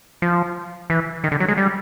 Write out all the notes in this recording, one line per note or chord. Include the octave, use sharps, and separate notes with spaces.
F3
E3
D#3
D3
F#3
G#3
G3